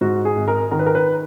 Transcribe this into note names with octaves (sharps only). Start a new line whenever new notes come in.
G#2 F#4
G#4
G#1
A#4
D#3 A#4
B4
A#4
B4